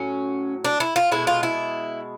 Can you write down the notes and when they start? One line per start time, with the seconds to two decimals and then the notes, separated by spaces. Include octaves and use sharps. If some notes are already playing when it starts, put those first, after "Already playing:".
Already playing: A2 F#3 C#4
0.65 D4
0.80 E4
0.96 F4
1.12 B2 G#3 E4
1.27 F4
1.43 E4